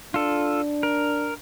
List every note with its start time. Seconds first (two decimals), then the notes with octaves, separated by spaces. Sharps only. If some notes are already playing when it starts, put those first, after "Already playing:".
0.14 D4 F4 A4
0.83 A#4